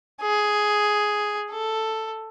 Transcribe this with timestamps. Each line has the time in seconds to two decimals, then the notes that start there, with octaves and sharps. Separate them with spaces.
0.22 G#4
1.51 A4